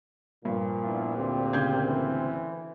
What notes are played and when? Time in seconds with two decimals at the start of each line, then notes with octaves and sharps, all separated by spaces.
0.45 G2 A#2 F3
0.82 B3 D4 E4
1.17 D2 D3 C4 G4
1.53 C#3 G6 G#6
1.87 E3